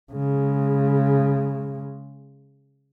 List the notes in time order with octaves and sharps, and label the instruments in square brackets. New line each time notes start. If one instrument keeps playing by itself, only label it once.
[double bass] C#3 G#3